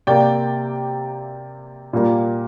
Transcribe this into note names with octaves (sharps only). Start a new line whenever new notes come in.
C3 A#3 D5 G5
A#2 G3 A#3